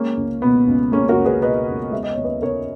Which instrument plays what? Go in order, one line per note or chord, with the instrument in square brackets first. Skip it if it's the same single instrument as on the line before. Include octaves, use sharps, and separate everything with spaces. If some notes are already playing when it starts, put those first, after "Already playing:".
Already playing: [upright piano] G#3 A#3 C#4
C#2
B2 B3
C#2
G#3 A#3 C#4
F#4 A#4
C#2
G#4 B4
B2 B4 D#5
C#2
G#3 E5
D#5
D#2 C#5
B4 D#5
C#3 A#4 C#5